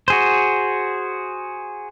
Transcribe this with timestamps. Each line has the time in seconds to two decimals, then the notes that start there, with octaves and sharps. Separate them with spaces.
0.08 F#4 G#4 C5